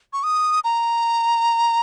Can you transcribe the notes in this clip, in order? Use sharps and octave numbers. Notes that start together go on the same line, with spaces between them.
C#6
D#6
A#5